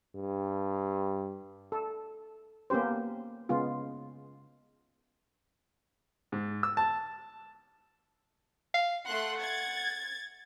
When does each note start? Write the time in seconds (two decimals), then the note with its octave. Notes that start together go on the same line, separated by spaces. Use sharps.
0.16 G2
1.72 A4
2.70 A#3 B3 C#4 G4 C5
3.49 C#3 G#3 B3 F4
6.32 G#2
6.63 E6
6.77 A5
8.74 F5
9.06 A3 F#5 C6 F#6
9.41 G#6 A6